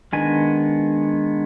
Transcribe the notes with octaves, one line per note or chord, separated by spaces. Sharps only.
D#3 G#3 B3 D4 G#5